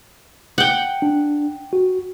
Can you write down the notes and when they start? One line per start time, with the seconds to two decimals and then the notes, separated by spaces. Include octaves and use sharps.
0.58 F#5 G5
1.02 D4
1.73 F#4